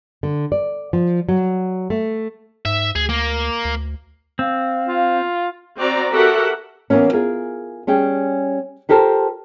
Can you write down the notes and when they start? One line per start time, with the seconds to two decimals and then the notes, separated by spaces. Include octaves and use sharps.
0.23 D3
0.52 D5
0.93 F3
1.29 F#3
1.90 A3
2.65 G#2 E5
2.95 D2 G#4
3.09 A#3
3.65 D2
4.39 C4 F5
4.88 F4
5.77 C4 F#4 D5 A#5
6.12 F#4 G4 A4 A#4 E5 F#5
6.90 E3 F#3 A#3 B3 C#4
7.13 F4 G#4 A#4
7.87 G3 C#4 G#4 G5
8.89 F4 G4 A4 A#4 C5